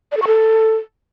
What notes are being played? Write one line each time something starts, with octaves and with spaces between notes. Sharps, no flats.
D5
A4
C#6
A4